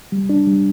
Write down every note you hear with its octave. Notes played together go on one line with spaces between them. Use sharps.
G3
D4
G3